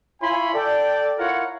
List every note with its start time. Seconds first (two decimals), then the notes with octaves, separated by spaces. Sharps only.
0.22 E4 F4 C#5 G#5 B5 C6
0.54 A4 D5 G5
1.19 E4 F4 A#4 C#5 F5 F#5